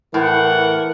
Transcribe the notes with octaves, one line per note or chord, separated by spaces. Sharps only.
A2 E3 A#4 F#5